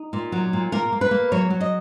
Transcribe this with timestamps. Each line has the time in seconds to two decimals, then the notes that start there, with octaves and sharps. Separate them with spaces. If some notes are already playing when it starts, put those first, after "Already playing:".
Already playing: D#4
0.13 A#2
0.32 F#3
0.53 A#2
0.72 A#3 A#4
0.92 A#3
1.01 B4
1.11 A#3
1.32 F#3 C#5
1.50 F#3
1.61 D#5